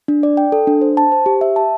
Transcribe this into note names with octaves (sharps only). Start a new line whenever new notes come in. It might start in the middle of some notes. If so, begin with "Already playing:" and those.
D4
D5
G5
A4
D4
C5
A5
C5
G4
E5
A5